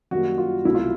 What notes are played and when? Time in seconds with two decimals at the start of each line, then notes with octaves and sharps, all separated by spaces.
0.11 F#2 D#3 G3 A#3 F#4
0.38 F4
0.65 C2 B2 F#3 A3 E4
0.75 F4